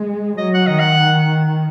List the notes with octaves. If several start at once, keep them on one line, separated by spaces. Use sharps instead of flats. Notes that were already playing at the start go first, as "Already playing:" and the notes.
Already playing: G#3
F#3 D#5
F#5
D#3 D#5
F#5